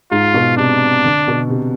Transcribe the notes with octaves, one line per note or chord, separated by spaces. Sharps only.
G#2 F4
B2
C3 D4
D3
B2
C3